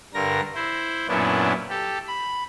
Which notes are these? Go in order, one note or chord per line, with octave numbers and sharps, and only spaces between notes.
G2 D3 A#4 A#6
E4 C5
F#2 A#2 B3 C#4 D4 E4
G4 A4
B5